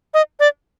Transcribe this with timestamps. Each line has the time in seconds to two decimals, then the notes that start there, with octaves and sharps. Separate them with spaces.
0.14 D#5
0.40 D5